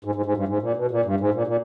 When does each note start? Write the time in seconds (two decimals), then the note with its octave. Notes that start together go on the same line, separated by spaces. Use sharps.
0.04 G#2
0.15 G#2
0.26 G#2
0.37 G2
0.48 G#2
0.62 A#2
0.76 B2
0.91 A#2
1.05 G2
1.20 G#2
1.34 A#2
1.47 A#2